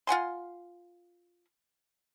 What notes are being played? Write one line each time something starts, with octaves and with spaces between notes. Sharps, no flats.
F4 F#5 G#5 C6